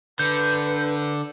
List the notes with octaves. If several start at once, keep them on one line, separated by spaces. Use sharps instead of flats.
D3 B4 G6